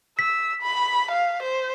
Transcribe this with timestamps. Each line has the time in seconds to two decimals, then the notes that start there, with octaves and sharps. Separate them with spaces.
0.19 E6 B6
0.62 B5
1.11 F5
1.43 C5